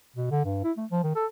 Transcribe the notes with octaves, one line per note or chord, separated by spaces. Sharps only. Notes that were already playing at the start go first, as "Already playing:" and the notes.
B2
D3
G2
E4
A3
F3
D#3
A4